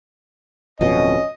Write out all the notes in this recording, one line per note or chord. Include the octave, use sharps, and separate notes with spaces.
D1 F2 B2 C#4 D#5